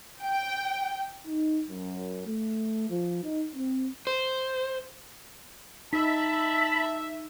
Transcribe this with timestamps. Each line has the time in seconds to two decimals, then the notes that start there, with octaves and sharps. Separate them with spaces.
0.22 G5
1.27 D#4
1.68 F#2
2.26 A3
2.89 F3
3.23 D#4
3.56 C4
4.07 C5
5.93 D#4 E5 A5 B5